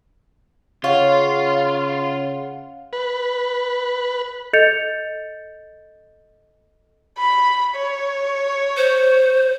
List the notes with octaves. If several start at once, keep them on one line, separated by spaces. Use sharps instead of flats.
C#3 F4 C#5 F5 F#5
B4
A4 D#5 G6 A6 C#7 F7
B5
C#5
C5